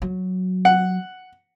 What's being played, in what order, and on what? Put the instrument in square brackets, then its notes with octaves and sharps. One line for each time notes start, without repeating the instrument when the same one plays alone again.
[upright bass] F#3
[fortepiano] F#5